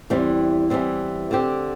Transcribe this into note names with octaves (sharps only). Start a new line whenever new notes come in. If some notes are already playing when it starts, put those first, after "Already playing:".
E2 E3 G3 C4
E2 E3 G3 C4
D3 C4 G4